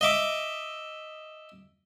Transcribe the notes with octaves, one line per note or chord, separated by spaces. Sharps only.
D#5 E5 D6